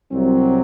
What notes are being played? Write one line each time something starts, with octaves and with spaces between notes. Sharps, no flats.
C2 C3 F#3 C4